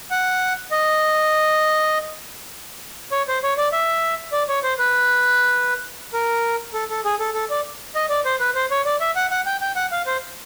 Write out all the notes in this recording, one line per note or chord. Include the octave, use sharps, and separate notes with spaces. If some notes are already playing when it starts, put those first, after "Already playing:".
F#5
D#5
C#5
C5
C#5
D5
E5
D5
C#5
C5
B4
A#4
A4
A4
G#4
A4
A4
D5
D#5
D5
C5
B4
C5
C#5
D5
E5
F#5
F#5
G5
G5
F#5
F5
C5